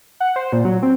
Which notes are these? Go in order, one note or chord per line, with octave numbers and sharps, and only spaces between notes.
F#5
C5
A#2
F#3
C4